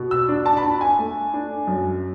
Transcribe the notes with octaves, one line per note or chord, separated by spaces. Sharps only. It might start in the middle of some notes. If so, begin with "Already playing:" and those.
Already playing: B2 B3
E6
D4
A5
B5
D4 A5
G#5
A3
D4
F#2